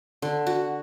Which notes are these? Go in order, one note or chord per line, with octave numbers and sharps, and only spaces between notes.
D3
F#4